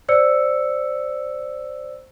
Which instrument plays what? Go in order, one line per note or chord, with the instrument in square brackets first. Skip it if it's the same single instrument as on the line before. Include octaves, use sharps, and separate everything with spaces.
[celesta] C5 D5 E6 C#7